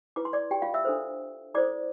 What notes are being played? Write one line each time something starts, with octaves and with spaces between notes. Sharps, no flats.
E4 B4 D6
C6
D5 D6
G4 G5
F4 F5
E5 E6
D4 A4 C5
E4 A4 C5 D5 D6